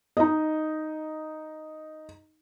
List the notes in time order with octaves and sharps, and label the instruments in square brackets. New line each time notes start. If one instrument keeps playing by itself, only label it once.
[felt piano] D#4 D#5